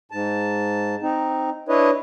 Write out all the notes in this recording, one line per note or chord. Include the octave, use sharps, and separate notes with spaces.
G#2 A5
C4 D#4
D4 E4 B4 C#5 D#5